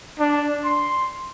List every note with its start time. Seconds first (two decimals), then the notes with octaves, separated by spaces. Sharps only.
0.20 D4
0.65 C6